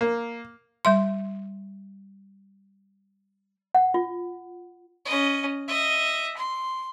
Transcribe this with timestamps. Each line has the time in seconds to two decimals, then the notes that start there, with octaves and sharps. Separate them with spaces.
0.01 A#3
0.85 G3 E5 C6
3.75 F#5
3.94 F4
5.05 C#4 D#5
5.68 D#5 E5
6.37 C6